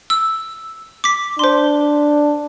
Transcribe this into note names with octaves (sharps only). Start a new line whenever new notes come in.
E6
D6 B6
D4 C5 C6